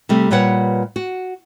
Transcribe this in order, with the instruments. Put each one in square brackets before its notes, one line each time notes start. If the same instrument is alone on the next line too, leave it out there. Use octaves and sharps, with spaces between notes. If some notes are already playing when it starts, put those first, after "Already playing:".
[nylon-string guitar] C3 G3 A3
A#2 G3 B4 C#5 F#5
F#4